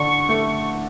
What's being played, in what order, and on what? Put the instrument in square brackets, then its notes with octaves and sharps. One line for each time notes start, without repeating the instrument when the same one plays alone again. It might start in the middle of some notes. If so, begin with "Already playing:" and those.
Already playing: [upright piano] D3 D4 [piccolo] C#6
[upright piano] A3